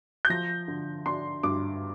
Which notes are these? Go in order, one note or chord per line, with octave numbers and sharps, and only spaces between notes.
G6
F3 A#6
D3
D4 C6
G2 D6